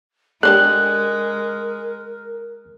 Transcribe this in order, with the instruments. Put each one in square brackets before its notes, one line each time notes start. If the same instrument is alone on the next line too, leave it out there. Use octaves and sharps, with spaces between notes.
[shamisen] D3 D4 G4 [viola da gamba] G#3 [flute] A#4 [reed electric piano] F#6